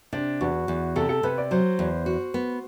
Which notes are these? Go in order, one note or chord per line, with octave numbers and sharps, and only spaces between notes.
C3 D4
E2 F#4
E2
C3 A4
A4
C3 B4
D5
F#3 C5
E2
F#4
B3